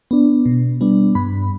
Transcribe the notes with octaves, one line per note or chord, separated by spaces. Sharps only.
B3 D4
B2
G3 B3 D4
G2 B5